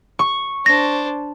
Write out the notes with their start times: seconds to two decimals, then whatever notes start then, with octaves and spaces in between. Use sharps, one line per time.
0.19 C#6
0.66 D4 C5 A#6